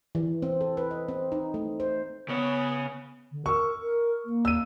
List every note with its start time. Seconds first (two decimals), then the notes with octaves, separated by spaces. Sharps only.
0.15 E3
0.42 C4
0.61 A4
0.77 B4
0.91 D#5
1.08 C4
1.32 D#4
1.54 A3
1.80 C5
2.28 C#3 B3 C#5
3.32 D3
3.46 A#4 C#6 E6
3.81 A#4
4.25 A#3
4.45 E6 D#7